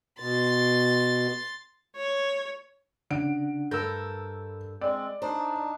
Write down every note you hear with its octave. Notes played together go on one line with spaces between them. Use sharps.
B2 C6 A6
C#5
C#3 D4 F#5 D7
G2 A4 A#4 E6 G6
G#3 C4 D5
D4 D#4 C5